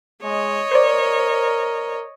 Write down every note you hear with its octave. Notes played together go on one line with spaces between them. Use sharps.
G#3 C#5 D#5
A#4 C5 D5